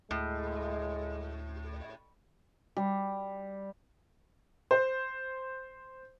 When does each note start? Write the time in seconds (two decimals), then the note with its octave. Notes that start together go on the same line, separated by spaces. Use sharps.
0.11 D2 A2 G#3
2.77 G3
4.71 C5